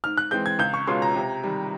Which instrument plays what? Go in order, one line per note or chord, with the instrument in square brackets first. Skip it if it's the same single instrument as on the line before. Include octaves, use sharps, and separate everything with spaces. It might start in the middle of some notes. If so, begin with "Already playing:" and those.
[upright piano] G#2 [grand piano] F6
[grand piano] F#6
[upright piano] E3 G#3 C4 [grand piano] G6
[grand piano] G#6
[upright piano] C#2 [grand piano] G6
[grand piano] C#6
[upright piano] B2 G#3 C#4 F4 [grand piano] C6
[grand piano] A#5
[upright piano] C3
D#3 G3